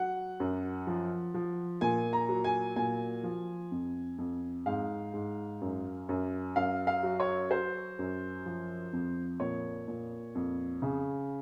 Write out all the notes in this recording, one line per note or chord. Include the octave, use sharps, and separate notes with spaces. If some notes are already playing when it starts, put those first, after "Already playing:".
Already playing: F#3 F#5
F#2
F3
F3
A#2 G#5
A#5
F#3
G#5
A#2 G#5
F3
F2
F2
G#2 F5
G#2
F#2
F#2
F#2 F5
F5
F#3
C#5
F#3 C5
F#2
F3
F2
A#2 C#5
A#2
F2
C#3